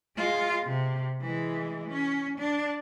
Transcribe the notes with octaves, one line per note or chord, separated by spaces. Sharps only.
G#3 F4
C3
E3 G#3
C#4
D4